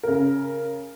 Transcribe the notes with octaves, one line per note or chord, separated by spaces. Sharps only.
C#3 A#4